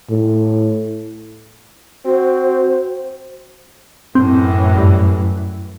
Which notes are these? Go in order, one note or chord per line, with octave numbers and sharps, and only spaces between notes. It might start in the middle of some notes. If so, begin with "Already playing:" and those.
A2
C4 F#4 C5
F#2 A2 E3 C4
G2